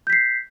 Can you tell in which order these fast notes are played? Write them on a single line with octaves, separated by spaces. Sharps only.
G6 B6 C7